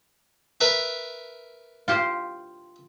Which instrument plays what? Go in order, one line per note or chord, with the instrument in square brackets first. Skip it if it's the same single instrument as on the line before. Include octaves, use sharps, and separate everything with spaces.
[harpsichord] A#4 B4 E5
[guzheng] F4 G4 C5